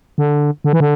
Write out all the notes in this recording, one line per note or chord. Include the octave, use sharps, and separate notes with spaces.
D3
D3
E3
D3